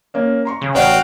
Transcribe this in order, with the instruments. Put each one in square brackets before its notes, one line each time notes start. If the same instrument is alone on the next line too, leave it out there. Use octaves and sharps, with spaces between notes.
[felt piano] A#3 C#4
A#5 C6 C#6
[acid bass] C#3
[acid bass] A1 [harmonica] F#4 F5 G5 [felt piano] C#5 D5